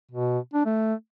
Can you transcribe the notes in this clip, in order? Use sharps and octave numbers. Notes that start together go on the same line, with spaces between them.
B2
D4
A3